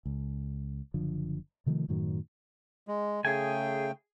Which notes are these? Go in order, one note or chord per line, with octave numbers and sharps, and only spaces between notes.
C#2
F#1 D3 F3
C3 D#3 F3 A3
F#2 A2 D#3 F#3
G#3
C#3 A3 G#4 G5 G#5